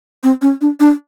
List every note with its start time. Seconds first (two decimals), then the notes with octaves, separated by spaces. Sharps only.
0.24 C4
0.42 C#4
0.61 D4
0.80 D4